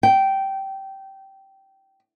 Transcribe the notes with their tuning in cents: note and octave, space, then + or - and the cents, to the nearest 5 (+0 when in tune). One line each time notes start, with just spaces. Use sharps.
G5 -15